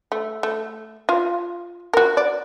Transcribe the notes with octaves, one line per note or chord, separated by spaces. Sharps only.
A3
A3
F4 F5
F#4 A#4
D5